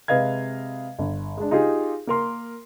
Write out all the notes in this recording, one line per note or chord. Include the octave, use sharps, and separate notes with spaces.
C3 G#3 B4 D#5 F5 G#6
G1
G#3 D4
D#4 F4 G4 G#4
A#3 A#4 C6